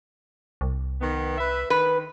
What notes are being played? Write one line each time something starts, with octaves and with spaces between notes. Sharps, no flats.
C2
D#3 B3
B4 E5
D#3 B4